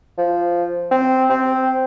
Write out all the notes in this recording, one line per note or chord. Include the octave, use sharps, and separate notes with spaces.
F3
C4
C4